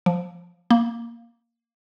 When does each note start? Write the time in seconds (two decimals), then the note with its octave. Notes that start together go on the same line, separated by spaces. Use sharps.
0.06 F3
0.71 A#3